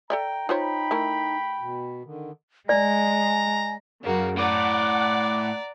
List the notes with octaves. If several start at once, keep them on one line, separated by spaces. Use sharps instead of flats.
A4 D5 E5 G5 A#5
D#4 F4 C5 C#5 G5 B5
A3 E4 A#4
B2
D3 D#3
G#3 D5 G#5 A#5
F#2 C#3 A#3 F#4
A2 D5 F#5 A#5 D6